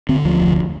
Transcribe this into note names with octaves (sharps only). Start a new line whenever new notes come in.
D3 C4
D2 F3
F1